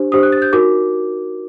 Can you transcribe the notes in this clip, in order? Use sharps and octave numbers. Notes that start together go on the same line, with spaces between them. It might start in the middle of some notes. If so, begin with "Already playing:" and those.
Already playing: D4 G4 C5
D4 G4 C5 D#6
F#6
A6
G6
D#4 F#4 A#4 D6